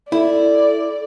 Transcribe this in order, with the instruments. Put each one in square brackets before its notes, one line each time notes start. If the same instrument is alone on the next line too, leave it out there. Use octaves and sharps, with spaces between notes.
[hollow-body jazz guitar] E4 [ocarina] A4 [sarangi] D5